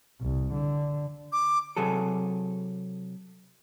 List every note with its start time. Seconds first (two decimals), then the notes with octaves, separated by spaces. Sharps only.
0.21 C2
0.54 D3
1.32 D6
1.76 C3 F#3 G#4 A4